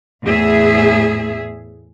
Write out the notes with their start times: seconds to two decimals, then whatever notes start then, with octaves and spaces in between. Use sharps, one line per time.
0.24 E2 A2 G#4 E5